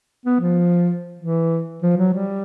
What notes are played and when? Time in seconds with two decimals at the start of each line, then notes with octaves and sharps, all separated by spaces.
0.26 B3
0.40 F3
1.19 E3
1.82 F3
1.97 F#3
2.13 G3